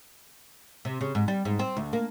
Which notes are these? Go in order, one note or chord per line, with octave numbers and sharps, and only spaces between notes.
C3
C#3
G#2
G3
G#2
C4
D2
A#3